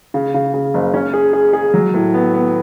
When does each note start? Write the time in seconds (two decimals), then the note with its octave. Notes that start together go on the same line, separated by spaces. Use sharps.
0.14 C#3
0.34 C#3
0.54 C#3
0.74 F#1
0.94 C#4
1.13 G#4
1.33 G#4
1.53 G#4
1.74 F#3
1.94 A2
2.14 B3
2.34 B3